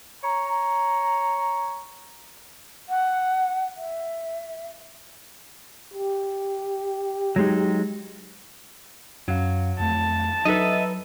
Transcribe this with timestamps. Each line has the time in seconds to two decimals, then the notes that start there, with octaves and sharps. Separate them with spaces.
0.24 C#5 A#5
2.89 F#5
3.77 E5
5.94 G4
7.36 F#3 G#3 D#4
9.28 F#2 F#3 F5
9.80 F2 A3 A5
10.45 F#3 D#4 A4 B4 D#5 E5